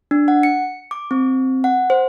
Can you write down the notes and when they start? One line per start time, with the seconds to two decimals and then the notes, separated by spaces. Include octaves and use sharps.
0.11 D4
0.28 F#5
0.43 C#7
0.91 D6
1.11 C4
1.64 F#5
1.90 C5